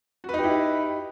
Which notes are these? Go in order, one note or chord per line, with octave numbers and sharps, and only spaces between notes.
D#4 E4 F#4 G4 B4